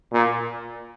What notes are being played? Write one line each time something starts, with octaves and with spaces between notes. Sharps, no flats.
A#2